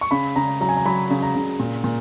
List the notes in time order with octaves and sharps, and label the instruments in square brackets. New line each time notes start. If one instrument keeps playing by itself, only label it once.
[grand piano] C#6
C#3 B5
C#3 A#5
F#3 A#5
G#5
A#5
F#3 B5
C#3
A#5
C#3
A#2
A#2